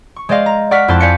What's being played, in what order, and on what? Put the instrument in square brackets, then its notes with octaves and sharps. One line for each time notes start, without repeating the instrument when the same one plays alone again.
[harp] C#6
G#3 C5 D5 D#5 F5
A#5
D5 F#5 C#6 F6 B6
F2 E4 C5 A5 F#6
D5 F5 G#5 G6 B6 C#7